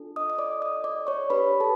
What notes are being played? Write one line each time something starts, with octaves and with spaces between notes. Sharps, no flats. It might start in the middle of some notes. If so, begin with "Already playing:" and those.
Already playing: D4 F4 A4
D#5 D#6
D#6
D5 D6
D#5 D#6
D5 D6
C#5 C#6
D4 G4 B4 B5
A4 A5